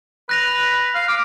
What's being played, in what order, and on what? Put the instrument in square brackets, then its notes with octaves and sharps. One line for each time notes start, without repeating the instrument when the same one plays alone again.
[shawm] B4 [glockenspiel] F#6 A#6 F7
[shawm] F5
[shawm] D6 [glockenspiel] F6